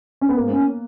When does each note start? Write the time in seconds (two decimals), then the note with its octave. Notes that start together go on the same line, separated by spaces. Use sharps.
0.21 C#4
0.29 B3
0.36 G#2 A#3
0.50 C#4